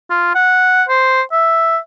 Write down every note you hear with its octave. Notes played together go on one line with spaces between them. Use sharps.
F4
F#5
C5
E5